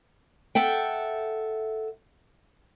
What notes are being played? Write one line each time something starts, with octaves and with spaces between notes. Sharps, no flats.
A4 E5 F#5 G5